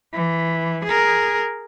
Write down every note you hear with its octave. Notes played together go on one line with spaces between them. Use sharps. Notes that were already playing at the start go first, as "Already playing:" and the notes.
E3
G#4 A#4